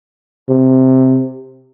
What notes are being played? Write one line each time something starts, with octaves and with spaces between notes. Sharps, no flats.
C3